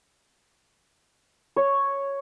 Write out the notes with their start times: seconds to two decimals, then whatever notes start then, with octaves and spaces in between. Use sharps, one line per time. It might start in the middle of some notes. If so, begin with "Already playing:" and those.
1.56 C#5